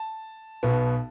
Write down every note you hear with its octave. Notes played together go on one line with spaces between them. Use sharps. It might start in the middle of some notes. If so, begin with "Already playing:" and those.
Already playing: A5
B1 B2 B3